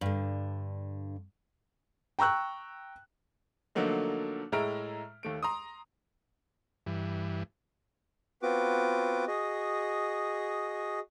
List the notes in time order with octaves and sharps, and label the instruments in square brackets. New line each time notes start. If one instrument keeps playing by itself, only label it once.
[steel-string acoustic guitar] G2 D3
[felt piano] G5 A#5 C#6 E6 F#6
[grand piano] D3 F3 F#3 A3 A#3 D#4
A2 G#3 E5 A#5 F6 D7
D#2 A3 D7
A#5 C6 D#6
[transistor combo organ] G2 E3
[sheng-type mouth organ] B3 C4 F4 F#4 B4 D6
F#4 G#4 D#5